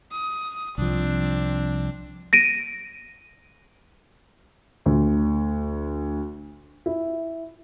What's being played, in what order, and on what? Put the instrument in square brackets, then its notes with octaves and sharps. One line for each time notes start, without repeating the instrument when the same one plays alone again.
[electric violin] D#6
[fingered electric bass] C2 F3 [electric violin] C4 D4
[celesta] A#6 D7 D#7
[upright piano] D2
E4